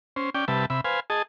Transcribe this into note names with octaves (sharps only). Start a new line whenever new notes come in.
C#4 C5
C#4 D5 G5
C3 G3 B4 E5 A5
C3 E5 B5
B4 C5 F5 G#5
G#4 D#5 A5